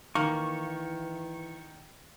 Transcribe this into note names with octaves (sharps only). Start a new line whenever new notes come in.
D#3 E3 A#3 C#6